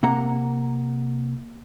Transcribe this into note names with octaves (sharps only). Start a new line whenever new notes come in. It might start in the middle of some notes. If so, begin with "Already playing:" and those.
C3 A#3 F#5 A#5